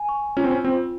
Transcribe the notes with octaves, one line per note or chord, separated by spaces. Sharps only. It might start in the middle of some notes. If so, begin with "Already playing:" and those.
Already playing: G#5
C#6
C#4 F4
C4
C#4
C4 F4